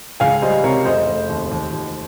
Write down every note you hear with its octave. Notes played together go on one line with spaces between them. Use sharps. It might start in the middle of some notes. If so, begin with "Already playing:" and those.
C#2 F5 G#5
G3 C5 D#5
C3 A#4 C#5
F1 C5 D#5
F1
D#2
D#2
D#2